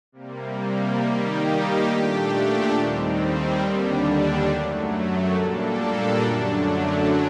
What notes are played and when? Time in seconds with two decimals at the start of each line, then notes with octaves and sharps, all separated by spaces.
0.12 C3 G3 A#3
0.99 D#3 G3 A#3 D#4 G4
1.87 A#2 A3 D4 G4
2.74 D#2 D#3 G3 C4
3.61 D#2 D3 G3 D4
4.48 F#2 F#3 A3
5.34 A#2 G3 A#3 D4 A4
6.22 F#2 D3 F#3 A3 D4